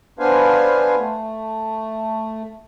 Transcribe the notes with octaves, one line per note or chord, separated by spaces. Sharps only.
B3 D4 B4 C5 F5 G#5
A3